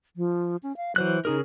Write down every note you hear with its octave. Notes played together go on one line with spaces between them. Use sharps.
F3
C#4
F5
E3 F#3 C5 F#6
C#3 D#4 G#4 A#4